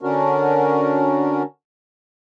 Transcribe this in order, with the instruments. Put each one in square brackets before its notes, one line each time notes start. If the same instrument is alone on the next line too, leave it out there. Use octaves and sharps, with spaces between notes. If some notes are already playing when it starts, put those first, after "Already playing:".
[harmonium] D3 C#4 D4 F#4 A#4